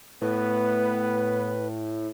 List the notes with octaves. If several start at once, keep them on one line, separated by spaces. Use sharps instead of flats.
A2 B3 B4